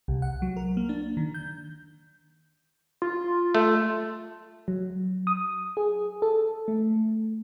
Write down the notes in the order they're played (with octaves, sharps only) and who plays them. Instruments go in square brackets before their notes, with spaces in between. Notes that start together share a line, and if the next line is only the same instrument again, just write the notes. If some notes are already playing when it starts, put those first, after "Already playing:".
[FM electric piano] C2
F#5
F#3
A#4
A#3
D4
D#3
G6
[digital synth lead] F4
[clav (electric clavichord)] A3
[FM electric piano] F#3
D#6
G#4
A4
A3